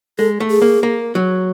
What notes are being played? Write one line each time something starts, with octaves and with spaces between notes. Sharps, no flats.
G#3 A4
A3
G#4
A#3
A#3
F#3